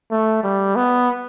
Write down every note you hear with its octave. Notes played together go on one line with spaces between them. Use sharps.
A3
G3
B3